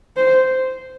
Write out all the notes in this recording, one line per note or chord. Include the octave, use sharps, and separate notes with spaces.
C5